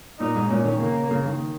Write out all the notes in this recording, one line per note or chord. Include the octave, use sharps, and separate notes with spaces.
A#2 D#4
G#2
A#2 C#4
D#3
C#3 A#3
C#3
D#3